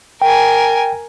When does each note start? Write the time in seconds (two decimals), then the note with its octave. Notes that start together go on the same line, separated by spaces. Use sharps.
0.22 A#4 G5 G#5